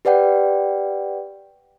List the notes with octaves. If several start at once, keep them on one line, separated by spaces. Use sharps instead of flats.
G4 B4 D5 F#5 G5